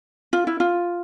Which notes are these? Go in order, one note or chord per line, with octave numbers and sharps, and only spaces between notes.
F4
E4
F4